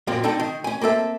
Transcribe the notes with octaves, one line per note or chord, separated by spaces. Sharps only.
F#2 A#2 A#3 C4
D3 C4 D#4 A4 G5 A5
D#3
C#4 G#5
A#3 C4 A4 E5